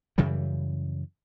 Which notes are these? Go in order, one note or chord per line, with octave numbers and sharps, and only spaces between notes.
F#2 C#3 E3 G3